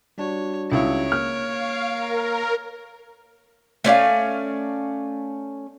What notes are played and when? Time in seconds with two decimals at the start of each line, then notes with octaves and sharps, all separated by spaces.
0.18 G3 D4 F#4 C#5
0.72 C#2 E4 C#5 D7
1.12 A#3 F6
1.45 F5
1.91 A#4
3.84 A3 C#4 D5 F5